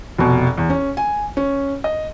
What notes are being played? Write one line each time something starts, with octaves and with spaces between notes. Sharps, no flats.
F1 B2
E2
C#4
G#5
C#4
D#5